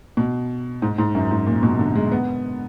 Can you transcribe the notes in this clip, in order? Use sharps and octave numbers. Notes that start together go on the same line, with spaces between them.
B2
G#2
G#2
F#2
G#2
A#2
B2
D3
G#3
B3